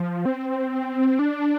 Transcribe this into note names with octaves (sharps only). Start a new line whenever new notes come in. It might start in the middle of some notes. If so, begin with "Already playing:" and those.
Already playing: F3
C4
D4